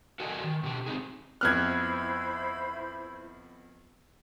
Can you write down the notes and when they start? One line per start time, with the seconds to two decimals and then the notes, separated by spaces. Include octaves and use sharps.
0.20 F#4 A4 A#4 D5 D#5 G#5
0.44 D#3
0.63 B2 D3 G4
0.86 C4 D#4 G#4
1.41 F2 B3 E4 C5 B5 F6 F#6 G#6